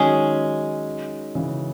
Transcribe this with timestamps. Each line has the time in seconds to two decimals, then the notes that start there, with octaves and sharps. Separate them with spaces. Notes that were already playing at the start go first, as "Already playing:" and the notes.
Already playing: D#3 F#3 G#3 C#4 G#4
1.35 C#3 E3